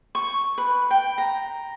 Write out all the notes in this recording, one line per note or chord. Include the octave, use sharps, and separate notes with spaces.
C#6
B4
G5
A#5